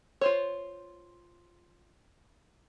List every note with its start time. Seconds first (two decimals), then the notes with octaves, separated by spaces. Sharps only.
0.21 F4 C5 C#5